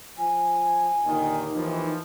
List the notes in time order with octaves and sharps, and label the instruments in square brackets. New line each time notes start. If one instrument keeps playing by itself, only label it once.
[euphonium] F3 [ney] G#5
[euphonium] D#2 [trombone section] A#2 D3 D#3
[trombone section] E3 F3 [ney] D#4